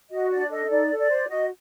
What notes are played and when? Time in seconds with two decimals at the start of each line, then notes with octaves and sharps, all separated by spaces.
0.10 F#4 D#5
0.31 D4 D5
0.50 A4 D#5
0.70 D#4 D5
0.90 A4
0.99 D5
1.10 C5
1.29 F#4 D#5